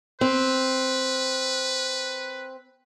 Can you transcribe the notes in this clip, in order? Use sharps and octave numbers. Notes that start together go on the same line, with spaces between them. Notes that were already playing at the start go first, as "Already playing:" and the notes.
C4 B4